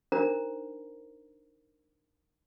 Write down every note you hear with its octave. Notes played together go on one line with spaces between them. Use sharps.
D4 D#4 A#4 C5 A#5